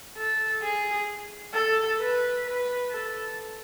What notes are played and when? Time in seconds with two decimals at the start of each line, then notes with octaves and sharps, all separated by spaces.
0.17 A4
0.63 G#4
1.54 A4
2.00 B4
2.45 B4
2.91 A4